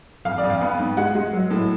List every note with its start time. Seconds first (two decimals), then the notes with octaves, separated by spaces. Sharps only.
0.25 F2 F5
0.38 D5
0.43 F2
0.50 F5
0.61 B3
0.79 G#2
0.97 G#3 F#5
1.15 G#3
1.33 F#3
1.50 A2